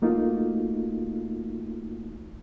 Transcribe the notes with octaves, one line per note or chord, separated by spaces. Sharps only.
A3 A#3 D#4 F4 F#4